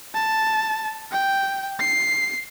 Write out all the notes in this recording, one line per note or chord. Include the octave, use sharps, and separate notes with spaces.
A5
G5
C7